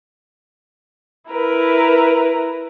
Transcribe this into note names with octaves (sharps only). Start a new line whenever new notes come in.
E4 A#4 B4